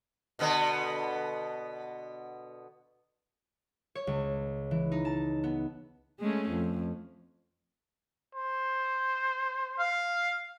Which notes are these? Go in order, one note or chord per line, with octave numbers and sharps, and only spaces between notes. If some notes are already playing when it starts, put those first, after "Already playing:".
B2 D3 B3
C#5
C#2
E3
D#4
A5
B3
G#3 A3 C#4
F2
C5
F5